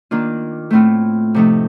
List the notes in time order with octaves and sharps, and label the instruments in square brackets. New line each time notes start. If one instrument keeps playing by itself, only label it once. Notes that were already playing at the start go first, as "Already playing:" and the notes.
[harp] D#3 A#3 D4 F4
A2 A3 C4 F4
C3 F3 A3 D#4